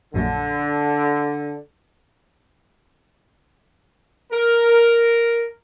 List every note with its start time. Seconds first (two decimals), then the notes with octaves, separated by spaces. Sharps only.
0.14 A#1 F#2 D3
4.32 A#4